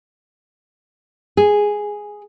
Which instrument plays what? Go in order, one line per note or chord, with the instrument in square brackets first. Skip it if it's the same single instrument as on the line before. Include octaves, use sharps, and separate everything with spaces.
[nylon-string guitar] G#4